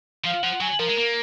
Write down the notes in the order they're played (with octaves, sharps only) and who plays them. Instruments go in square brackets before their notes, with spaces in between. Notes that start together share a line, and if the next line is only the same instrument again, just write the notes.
[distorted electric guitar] F3 [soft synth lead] F5
[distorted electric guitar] F3 [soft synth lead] F#5
[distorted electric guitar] F#3 [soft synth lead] G#5
[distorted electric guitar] F3 [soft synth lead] A#4
[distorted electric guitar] G#3
A#3